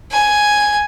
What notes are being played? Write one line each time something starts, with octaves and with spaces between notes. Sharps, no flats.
G#5